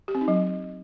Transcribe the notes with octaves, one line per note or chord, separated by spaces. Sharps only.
G4
C4
D#4
F#3